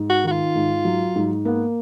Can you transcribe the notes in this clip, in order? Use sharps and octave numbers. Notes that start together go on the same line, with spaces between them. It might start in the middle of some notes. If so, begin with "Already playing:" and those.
Already playing: G#2
F#4
D#3 F#4
F4
G#2
F#3
G#2
A#3 B3